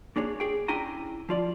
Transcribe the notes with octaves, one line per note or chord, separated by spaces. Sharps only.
A#3 D4 G#4 C#5
G#4 G5
C#4 D4 E4 G5 G#5 A#5
F3 F4 D5